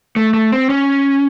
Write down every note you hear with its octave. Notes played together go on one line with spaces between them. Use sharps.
A3
A3
C4
C#4